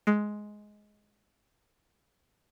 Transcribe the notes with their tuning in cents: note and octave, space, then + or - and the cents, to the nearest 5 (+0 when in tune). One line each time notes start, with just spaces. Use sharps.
G#3 +10